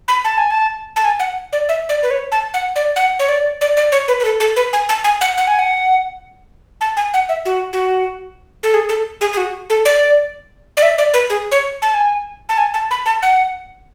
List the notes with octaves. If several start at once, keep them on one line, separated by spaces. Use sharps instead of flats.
B5
A5
G#5
A5
A5
G#5
F#5
D5
E5
D5
B4
C#5
A5
F#5
D5
F#5
C#5
D5
D5
D5
C#5
B4
B4
A4
A4
B4
G#5
A5
G#5
F#5
F#5
G#5
F#5
A5
G#5
F#5
E5
F#4
F#4
A4
G#4
A4
G#4
G#4
F#4
A4
D5
D5
E5
D5
B4
G#4
C#5
A5
G#5
A5
G#5
A5
B5
A5
F#5